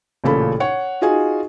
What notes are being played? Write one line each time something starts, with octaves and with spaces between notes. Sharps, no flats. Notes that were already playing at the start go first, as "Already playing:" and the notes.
A1 A#2 C#3 A4 B5
C#5 F#5
D#4 F4 F#4 G#4 D#5 G#5